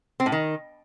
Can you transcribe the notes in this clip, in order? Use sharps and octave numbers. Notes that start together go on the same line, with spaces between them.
C4
A2
D#3